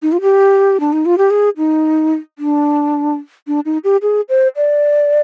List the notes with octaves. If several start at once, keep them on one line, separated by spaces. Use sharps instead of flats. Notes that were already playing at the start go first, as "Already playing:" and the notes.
D#4
F4
G4
D4
D#4
F4
G4
G#4
D#4
D4
D4
D#4
G4
G#4
C5
D5